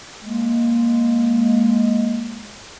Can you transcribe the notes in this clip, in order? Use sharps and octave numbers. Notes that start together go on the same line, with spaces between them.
G#3 A#3